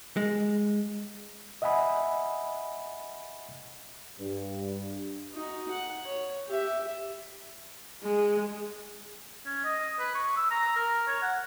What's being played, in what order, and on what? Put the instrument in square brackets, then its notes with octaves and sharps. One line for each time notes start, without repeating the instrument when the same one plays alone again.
[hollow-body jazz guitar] G#3
[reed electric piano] D#5 E5 F#5 G#5 B5 D#6
[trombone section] G2
[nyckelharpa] D#4 F#4
F#5
C#5
G4 E5
[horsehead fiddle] G#3
[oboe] C#4
D#5
B4
C#6
E6
A#5
A#4
C#5
F#5